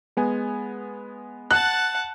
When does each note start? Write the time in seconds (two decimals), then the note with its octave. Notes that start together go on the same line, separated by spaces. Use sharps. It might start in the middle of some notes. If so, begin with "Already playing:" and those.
0.17 G#3 B3 G#5
1.51 F#5 A5 F#6